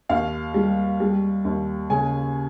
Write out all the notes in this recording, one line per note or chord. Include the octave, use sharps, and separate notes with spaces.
D#2 F5
G3
G3
D#2
C#3 G#5